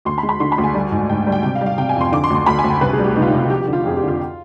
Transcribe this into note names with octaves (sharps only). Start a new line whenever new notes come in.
D2 C6
B5
G#3
B5
D3 C6
B5
D2
G#5
G3
G#2
G#2 G5
G3
G5
C3 G5
F5
G3
F5
C3 G5
G#5
F2 C6
D3 D6
C6
D2
C6
D2 B5
G#5
D2
G5
C2 B4
G#4
G3
G4
C2 D#4
F4
D#4
C2
F4
F3 G4
G4
D3
F4
F2 G#4
G4
D3
F4